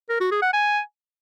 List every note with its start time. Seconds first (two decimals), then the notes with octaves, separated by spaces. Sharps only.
0.09 A#4
0.20 F#4
0.31 G#4
0.42 F#5
0.53 G#5